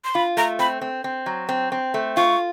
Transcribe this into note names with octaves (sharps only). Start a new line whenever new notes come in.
C6
F4 B5
A3 A#5
C4 B5
C4
C4
F#3
C4
C4
A3
F4 C#6